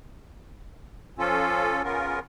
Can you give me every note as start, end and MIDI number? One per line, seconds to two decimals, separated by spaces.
1.19 1.82 53
1.19 1.82 61
1.19 1.82 65
1.19 1.82 69
1.84 2.19 49
1.84 2.19 59
1.84 2.19 61
1.84 2.19 65
1.84 2.19 70